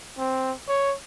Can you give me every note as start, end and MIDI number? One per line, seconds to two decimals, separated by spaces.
0.18 0.52 60
0.68 0.95 73